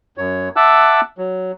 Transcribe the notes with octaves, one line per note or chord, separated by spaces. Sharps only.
F#2 C#5
E5 F#5 A5 D6 E6 F#6
F#3